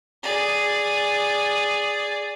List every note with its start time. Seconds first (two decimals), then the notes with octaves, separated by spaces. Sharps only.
0.23 G#4 D5